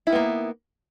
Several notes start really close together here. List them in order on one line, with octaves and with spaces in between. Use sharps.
E4 D#3 B3 A#3